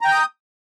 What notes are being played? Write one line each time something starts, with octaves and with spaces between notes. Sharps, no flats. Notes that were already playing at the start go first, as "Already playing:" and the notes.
G5 A#5 D#6 G6